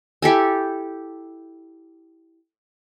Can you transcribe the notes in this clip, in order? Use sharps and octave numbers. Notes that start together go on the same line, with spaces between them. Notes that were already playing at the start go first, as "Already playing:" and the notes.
E4 G4 A4 G#5